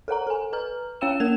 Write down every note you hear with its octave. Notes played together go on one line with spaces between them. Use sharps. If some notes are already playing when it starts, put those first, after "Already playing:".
A4 A#4 F#5 A#5
A4 G#5
B4 A#5 F6
C#4 C#5 F5 G5 E6 E7
A#3 A#4 G#6 E7 F7